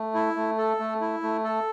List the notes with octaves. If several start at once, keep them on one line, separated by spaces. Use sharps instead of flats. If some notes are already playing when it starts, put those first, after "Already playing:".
Already playing: A3
E4
A3
A4
A3
E4
A3
A4